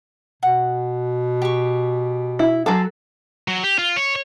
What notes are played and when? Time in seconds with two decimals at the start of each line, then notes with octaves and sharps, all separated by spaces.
0.43 B2 F#5
1.42 G4 C#6
2.39 E4
2.66 F#3 G#4 A4 C5 A5
3.48 F#3
3.64 G4
3.79 F4
3.96 C#5